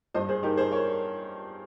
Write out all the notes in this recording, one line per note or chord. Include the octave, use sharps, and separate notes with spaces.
G2 C5 D#5
G#4 C5
D#4 G4 A#4
G#4 C5
A#4 C#5